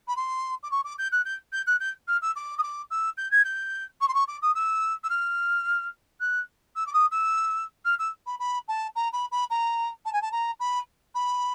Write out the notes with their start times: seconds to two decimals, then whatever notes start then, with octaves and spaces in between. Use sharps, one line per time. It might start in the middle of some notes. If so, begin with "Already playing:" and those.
0.08 B5
0.16 C6
0.63 D6
0.71 C#6
0.84 D6
0.99 G6
1.12 F#6
1.25 G6
1.53 G6
1.67 F#6
1.80 G6
2.08 F6
2.22 E6
2.36 D6
2.58 D#6
2.63 D6
2.91 E6
3.18 G6
3.31 G#6
3.45 G6
4.01 C#6
4.08 C6
4.14 C#6
4.28 D6
4.42 D#6
4.55 E6
5.04 E6
5.10 F6
6.20 F#6
6.76 E6
6.87 D6
6.93 D#6
7.11 E6
7.85 F6
7.99 E6
8.26 B5
8.39 B5
8.68 A5
8.96 A#5
9.13 B5
9.32 B5
9.50 A#5
10.05 A5
10.13 G#5
10.22 A5
10.32 A#5
10.60 B5
11.15 B5